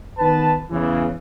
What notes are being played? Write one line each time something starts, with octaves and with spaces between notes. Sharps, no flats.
D#3 B3 B4 A5
E2 C#3 E3